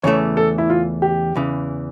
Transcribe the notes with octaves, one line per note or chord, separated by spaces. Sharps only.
E2 C#3 E3 A3 C#5
A4
E4
F4
G4
E2 C#3 E3